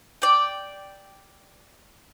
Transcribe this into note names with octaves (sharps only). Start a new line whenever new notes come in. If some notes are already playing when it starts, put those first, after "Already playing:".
D5 G5